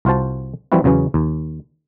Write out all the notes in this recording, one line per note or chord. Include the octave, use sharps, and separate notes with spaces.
C2 F4 F#4 C5 A5
E3 F3 G3 C4 E4 F#4
E2 C#3 F#3 B3 C#4
D#2